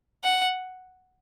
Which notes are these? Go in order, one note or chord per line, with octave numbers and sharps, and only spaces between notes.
F#5